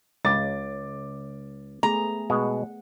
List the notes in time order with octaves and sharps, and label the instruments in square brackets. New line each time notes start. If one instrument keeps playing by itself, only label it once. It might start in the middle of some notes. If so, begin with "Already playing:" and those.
[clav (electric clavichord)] C#2 [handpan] G#3 [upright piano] D6 A6
[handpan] A3 B3 G#4 [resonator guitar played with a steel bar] A#5
[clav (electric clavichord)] B2 G#3 [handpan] F#5